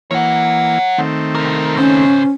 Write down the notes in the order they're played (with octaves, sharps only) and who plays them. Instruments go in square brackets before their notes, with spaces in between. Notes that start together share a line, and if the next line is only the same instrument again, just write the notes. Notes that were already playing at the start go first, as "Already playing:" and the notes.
[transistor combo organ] E3 A#3 [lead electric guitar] C#5 F#5
[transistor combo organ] D#3 A3 C4
[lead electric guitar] C2 A#4
[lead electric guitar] C#3 C5 [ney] C#4